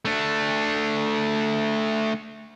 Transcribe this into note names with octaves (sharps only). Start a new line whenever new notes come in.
A3 D4